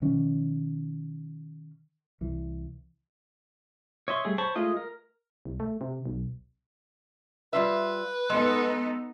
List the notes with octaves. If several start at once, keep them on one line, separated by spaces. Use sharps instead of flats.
B2 D#3 F3 C#4
C2 E3
C#5 D#5 E5 C6 C#6
G3 A3 G#4
C5 C#5 A5 B5 C#6
G#3 A3 F4 D#5
A#4
C2
A3
C3
B1
G3 F4 B4 E5
G#3 B3 D#4 A4